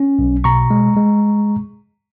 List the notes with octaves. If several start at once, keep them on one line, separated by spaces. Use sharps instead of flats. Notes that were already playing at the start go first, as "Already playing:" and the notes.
Already playing: C#4
B1
B2 A#5 C#6
G#3
G#3